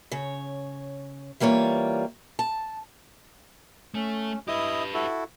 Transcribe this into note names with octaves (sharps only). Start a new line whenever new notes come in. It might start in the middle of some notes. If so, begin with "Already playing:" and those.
C#3 C#5
E3 G3 A#3 F4 C#5
A5
A3 C#4
E4 G4 B4 D#5 D#6
E4 F#4 A4